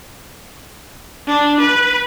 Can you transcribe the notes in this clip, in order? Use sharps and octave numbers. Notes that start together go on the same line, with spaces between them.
D4
B4